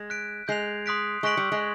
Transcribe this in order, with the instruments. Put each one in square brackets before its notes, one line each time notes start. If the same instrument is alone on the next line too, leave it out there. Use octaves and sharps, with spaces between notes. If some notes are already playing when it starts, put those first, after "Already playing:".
Already playing: [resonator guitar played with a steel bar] G#3
[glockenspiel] F#6 B6 D7
[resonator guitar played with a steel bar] G#3 [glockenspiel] G6 C7 F7
[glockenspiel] C6 D#6 F#6 B6 D7
[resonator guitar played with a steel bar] G#3 [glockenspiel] C#6 F#6 B6 D7 F#7
[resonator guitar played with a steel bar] G3
G#3